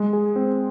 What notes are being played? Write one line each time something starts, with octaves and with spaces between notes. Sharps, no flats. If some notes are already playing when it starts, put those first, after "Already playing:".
Already playing: G#3
G#4
C4